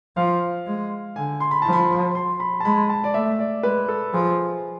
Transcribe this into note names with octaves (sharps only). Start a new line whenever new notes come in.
F3 F5
G#3
D3 G#5
C6
B5
F3 A5
B5
C6
B5
A5
G#3 B5
A5
D5
A3 E5
D5
G#3 B4
A4
F3 G#4